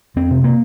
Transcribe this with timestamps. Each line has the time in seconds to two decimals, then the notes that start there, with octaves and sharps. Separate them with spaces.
0.16 F2 C4
0.31 C3
0.44 A#3